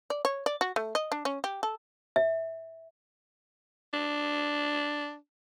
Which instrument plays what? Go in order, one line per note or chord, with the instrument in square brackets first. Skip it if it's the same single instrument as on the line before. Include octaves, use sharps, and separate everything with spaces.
[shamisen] D5
C#5
D5
F#4
A3
D#5
D4
C#4
G4
A4
[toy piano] E5
[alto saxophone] D4